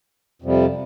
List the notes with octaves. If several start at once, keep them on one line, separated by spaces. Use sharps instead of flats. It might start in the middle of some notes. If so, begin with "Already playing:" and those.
F2 C3 G3